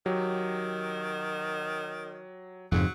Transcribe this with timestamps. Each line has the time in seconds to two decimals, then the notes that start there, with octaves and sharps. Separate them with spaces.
0.06 D#3 F#3 G4
2.72 F2 G#2 C#3 F#3